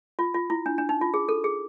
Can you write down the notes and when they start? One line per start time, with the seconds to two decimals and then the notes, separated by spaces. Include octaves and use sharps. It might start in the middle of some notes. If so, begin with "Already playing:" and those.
0.19 F4
0.34 F4
0.50 E4
0.66 D4
0.78 D4
0.89 D#4
1.01 F4
1.14 G#4
1.29 A4
1.44 G#4